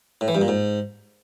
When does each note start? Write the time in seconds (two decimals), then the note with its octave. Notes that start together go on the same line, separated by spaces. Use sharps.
0.21 A2
0.28 E3
0.35 G2
0.41 A#2
0.48 G#2